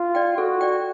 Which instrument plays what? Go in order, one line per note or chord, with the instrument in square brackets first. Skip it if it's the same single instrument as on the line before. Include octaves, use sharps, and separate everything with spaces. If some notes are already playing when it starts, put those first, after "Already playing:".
Already playing: [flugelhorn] F4
[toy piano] D5 G5
[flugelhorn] F#4 [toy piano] A4
[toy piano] D5 G5